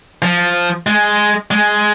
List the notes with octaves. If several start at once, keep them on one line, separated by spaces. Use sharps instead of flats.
F3
G#3
G#3